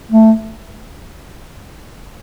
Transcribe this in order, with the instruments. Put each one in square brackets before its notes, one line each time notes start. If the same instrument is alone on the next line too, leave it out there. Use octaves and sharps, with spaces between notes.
[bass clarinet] A3